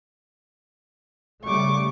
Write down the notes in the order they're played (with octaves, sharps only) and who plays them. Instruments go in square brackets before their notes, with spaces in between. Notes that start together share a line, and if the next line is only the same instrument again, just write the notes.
[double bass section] C#3 G3 A3 [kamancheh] C#6 D6